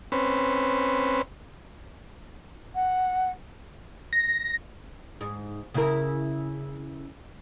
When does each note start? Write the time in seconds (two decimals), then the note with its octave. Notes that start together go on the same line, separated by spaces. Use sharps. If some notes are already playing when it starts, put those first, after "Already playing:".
0.12 C4 C#4 B4
2.75 F#5
4.13 A#6
5.21 G#2
5.74 C#3 E4 A#4